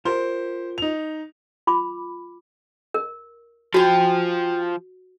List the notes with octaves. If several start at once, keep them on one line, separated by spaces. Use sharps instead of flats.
F4 G4 A#4 C5 C6
D#4 F7
F4 B5 D6
A#4
F3 F#4 G5 G#5